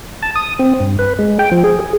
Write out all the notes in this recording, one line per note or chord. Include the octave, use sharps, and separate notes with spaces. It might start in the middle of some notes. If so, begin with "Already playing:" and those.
A5
D#6
C4
G2
B4
G#3
G5
F3
G#4
G#4